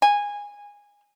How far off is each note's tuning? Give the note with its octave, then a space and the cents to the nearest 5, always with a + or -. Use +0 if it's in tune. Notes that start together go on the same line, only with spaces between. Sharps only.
G#5 -15